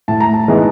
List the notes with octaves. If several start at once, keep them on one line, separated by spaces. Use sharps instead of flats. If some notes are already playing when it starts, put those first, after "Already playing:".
A2 A5
A#5
A5
E3 G#3 B3 D#4